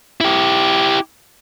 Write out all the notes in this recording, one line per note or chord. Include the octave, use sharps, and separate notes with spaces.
E4 G4